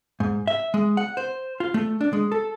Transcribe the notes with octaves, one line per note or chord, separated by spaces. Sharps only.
G#2
E5
G#3
F#5
C5
F4
A3
D4
G#3
A4